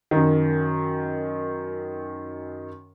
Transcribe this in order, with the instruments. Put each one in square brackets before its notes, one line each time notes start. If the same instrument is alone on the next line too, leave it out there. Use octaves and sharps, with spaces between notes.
[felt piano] F#2 D#3